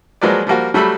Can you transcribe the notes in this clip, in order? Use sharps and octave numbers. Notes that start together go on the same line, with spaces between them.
F3 F#3 G#3 A#3 B4 D5
F3 G3 A#3 F#4
F#3 G3 A3 A4 B5